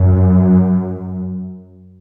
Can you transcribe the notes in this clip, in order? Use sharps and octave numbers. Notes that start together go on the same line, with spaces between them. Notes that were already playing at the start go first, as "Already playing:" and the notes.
Already playing: F#2